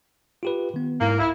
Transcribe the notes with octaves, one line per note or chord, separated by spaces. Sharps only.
F4 G4 B4
D#3 B3
G#2 A#3 E4
C2 E4 E5